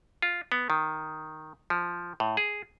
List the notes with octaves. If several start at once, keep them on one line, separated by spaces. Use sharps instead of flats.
F4
B3
D#3
F3
A2
G#4